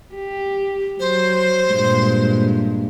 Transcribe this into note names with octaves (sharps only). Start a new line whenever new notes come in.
G4
F#3 C5
G2 A#2 G#3